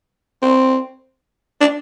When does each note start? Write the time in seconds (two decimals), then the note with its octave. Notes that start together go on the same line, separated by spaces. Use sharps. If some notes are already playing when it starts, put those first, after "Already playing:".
0.42 C4
1.61 D4